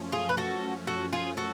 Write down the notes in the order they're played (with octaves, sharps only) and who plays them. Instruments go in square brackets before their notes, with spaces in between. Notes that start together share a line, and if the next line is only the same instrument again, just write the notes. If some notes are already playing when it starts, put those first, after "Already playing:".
Already playing: [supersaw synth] F#2 F3 A3 C#4
[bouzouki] F4 G#4
B4
F#4 A4
F#4 A4
F4 G#4
F#4 A4